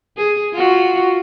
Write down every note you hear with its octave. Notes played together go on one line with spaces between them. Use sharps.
G#4
F4 F#4